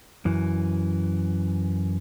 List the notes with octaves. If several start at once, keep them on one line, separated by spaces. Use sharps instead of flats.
F#2 E3